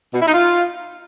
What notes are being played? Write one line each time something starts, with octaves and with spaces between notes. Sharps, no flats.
B2
E4
D#4
F4